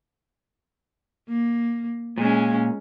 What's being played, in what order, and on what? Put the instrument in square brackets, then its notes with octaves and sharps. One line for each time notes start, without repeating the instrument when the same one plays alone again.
[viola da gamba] A#3
[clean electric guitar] A#2 [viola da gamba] G#3 C#4